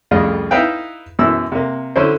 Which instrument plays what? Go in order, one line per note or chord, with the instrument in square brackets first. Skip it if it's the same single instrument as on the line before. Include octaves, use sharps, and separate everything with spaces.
[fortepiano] C2 F2 A2 C#3 F4 D#5
D#4 E4 B4 E5 F5 G5
F#2 B2 E3 E4 E6
C3 A#3
D3 F#3 C#4 E4 C5